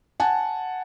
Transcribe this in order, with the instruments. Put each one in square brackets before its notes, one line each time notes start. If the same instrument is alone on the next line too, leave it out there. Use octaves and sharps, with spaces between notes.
[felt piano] F#5 G#5 A5